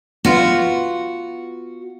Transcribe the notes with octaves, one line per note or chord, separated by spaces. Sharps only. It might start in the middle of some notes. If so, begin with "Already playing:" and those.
B3 F4 F#4